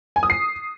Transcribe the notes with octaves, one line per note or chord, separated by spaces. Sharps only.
G#5
D#6
C7